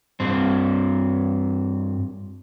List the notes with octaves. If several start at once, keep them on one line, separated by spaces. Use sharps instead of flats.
G2 C4